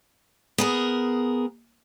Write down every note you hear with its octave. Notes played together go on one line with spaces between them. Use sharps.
B3 G#4 A#4